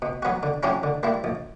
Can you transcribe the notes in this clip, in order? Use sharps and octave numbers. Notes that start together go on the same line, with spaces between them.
B2
F#3 B3 F#4
D3
F#3 C#4 E4 G4
D3
G3 A#3 E4
A#1